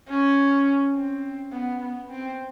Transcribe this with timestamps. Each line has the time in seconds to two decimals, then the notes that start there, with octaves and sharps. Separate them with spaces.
0.09 C#4
0.95 C4
1.52 B3
1.81 B3
2.09 C4